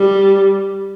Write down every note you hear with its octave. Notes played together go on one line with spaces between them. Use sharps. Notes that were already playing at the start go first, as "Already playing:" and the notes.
Already playing: G3